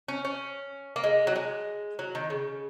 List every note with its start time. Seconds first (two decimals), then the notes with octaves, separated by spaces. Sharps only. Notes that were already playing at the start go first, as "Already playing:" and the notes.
0.08 C#4
0.25 C#4
0.96 A#3
1.04 G#3
1.27 F#3
1.36 G#3
1.99 F#3
2.15 D#3
2.30 C#3